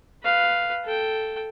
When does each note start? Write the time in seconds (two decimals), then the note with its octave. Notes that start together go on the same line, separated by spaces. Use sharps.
0.23 B4 F5
0.84 A4 G5